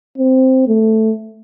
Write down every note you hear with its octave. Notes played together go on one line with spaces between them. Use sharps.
C4
A3